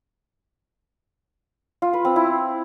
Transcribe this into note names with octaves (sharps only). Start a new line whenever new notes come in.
F4
B4
C4
E4